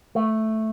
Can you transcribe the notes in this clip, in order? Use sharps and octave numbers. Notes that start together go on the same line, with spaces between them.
A3